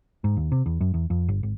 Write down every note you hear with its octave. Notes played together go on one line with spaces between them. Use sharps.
G#2
D#2
C3
E2
F#2
E2
F2
G1
G#1